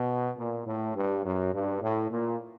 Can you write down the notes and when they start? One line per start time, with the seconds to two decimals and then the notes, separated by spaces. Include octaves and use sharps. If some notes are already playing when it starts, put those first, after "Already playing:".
Already playing: B2
0.37 A#2
0.66 A2
0.95 G2
1.25 F#2
1.53 G2
1.82 A2
2.10 A#2